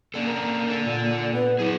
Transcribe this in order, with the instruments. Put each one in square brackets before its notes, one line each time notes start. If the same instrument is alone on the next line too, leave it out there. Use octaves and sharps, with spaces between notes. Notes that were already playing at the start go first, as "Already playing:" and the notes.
[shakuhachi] A#3 [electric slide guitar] C#4 D4 A4
[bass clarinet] A#4
[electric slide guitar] D4 A4
[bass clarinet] A#2
[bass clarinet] B3 [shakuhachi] B4
[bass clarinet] F#3 [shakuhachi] E4 [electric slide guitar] F#4 G#4